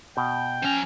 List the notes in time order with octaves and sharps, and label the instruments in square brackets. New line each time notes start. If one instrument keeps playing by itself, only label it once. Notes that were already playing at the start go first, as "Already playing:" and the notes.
[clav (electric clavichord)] B2 [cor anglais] G5
[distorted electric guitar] F3 A#5 [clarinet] C#4